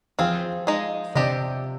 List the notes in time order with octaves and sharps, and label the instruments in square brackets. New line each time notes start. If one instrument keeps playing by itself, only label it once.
[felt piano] F3 [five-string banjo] C4 F4 G#4
[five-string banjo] G#3 D#4 G#4
[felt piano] C3 [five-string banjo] D4 G4 C5 D#5